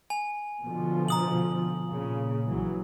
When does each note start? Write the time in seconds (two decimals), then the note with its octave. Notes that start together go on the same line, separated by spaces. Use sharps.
0.10 G#5
0.64 B2 D3 F3
1.08 A#5 D#6 F#7
1.87 A#2 C#3
2.47 A#1 E3 F#3